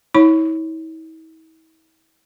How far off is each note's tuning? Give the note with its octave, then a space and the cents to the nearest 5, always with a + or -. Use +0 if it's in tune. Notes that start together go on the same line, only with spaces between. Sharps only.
E4 -45 C#5 +0 B5 +15